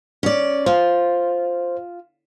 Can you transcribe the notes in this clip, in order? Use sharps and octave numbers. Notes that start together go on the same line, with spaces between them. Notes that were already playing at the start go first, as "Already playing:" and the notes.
C#4 D5
F4 C5